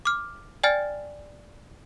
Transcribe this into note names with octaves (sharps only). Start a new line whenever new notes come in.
D6 F6
D5 G5 G#5 F6 A6